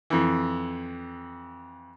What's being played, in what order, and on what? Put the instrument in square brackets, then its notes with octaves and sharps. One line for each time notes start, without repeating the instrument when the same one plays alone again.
[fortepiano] F2 E3